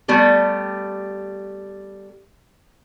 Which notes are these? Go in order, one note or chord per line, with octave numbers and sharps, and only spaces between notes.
G3 A3 B3 G4